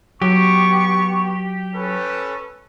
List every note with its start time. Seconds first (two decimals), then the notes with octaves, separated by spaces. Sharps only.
0.22 F#3 B3 G4 C#6
1.74 C#4 A4 B4